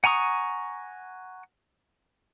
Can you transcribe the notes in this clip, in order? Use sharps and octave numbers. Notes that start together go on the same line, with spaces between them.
F#5 G#5 A#5 C#6 D#6